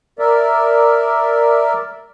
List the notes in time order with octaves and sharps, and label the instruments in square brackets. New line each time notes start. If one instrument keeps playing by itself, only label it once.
[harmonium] A#4 D5 E5